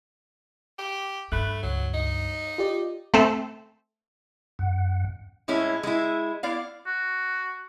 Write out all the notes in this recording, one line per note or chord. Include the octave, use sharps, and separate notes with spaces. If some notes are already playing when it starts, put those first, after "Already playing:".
G4
G2 A3 B5 F#6
C#2 F#3
D#4
F4 G4 D5
A3 C4 A4
F#2 F#5
A2 G#3 C#4 E4
G#3 E4
B3 E4 D5 F5
F#4